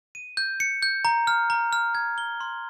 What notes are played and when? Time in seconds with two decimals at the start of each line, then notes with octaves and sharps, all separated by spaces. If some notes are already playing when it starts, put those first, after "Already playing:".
0.15 D#7
0.37 G6
0.60 C#7
0.83 G6
1.05 A#5
1.27 F6
1.50 A#5
1.73 F6
1.95 G#6
2.18 G7
2.41 C6